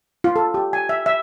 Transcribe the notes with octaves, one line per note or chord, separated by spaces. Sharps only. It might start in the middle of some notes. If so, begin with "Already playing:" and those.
F4
A4
G4
G#5
E5
E5